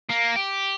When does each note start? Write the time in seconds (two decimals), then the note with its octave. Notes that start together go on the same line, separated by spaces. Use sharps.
0.09 A#3
0.36 G4